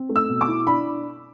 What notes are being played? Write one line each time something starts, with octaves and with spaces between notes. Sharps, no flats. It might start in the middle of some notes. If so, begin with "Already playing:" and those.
Already playing: C4
A3
E6
B2
D6
E4
D4 B5